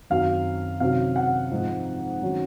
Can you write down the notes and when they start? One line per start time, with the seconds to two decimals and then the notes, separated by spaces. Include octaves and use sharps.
0.10 F#2 D#3 F#3 C4 F5
0.80 C3 D#3 F#3 C#4 F5
1.16 F#5
1.51 G#2 F3 C4 D#4
2.22 D#3 F#3 C#4